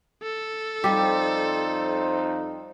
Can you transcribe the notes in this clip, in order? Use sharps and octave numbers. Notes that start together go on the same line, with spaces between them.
A4
F2 G3 D#4 G4 C5